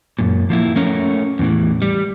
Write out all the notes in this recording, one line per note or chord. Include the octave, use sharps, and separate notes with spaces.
F#2 A#2
F3 A#3 E4
A3 C#4 A#4
E2 A2 E3
G3